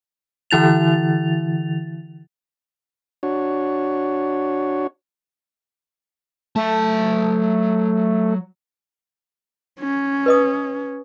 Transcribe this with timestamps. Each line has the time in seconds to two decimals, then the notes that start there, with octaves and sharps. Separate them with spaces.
0.51 D3 E3 E4 A6 F7
3.23 D4 F#4 C#5
6.56 F#3 A3 A5
9.79 C#4
10.26 B4 D#5 D#6